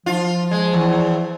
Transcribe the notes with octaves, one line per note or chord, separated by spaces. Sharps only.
F3 F4
G#3
E2